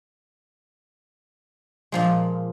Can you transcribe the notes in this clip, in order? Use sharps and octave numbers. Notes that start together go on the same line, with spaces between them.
A#2 F3 G#3